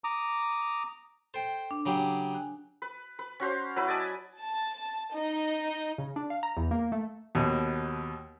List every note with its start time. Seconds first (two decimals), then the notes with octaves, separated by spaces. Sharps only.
0.04 A#5 D6 D#6
1.34 A4 C5 G5
1.71 D4
1.86 C#3 F#3 G4
2.34 G#5 F#6
2.82 B4
3.19 B4
3.40 C#4 F#4 C5 F5
3.76 F#3 E4 B4 B5
3.88 D5 D#5 G#5 A5
4.38 A5
5.13 D#4
5.98 C#3
6.16 D4
6.30 F5
6.43 A#5
6.57 E2
6.71 A#3
6.92 A3
7.35 D#2 B2